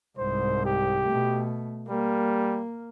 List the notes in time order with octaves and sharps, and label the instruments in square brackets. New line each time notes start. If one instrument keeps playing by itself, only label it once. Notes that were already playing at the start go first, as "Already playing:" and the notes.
[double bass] C2 G#2 [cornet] C5
[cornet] G4
[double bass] B2 A3
[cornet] G3 [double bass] A#3